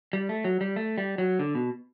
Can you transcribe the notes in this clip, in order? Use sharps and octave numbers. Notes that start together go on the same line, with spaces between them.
G3
A3
F#3
G3
A3
G3
F#3
D3
B2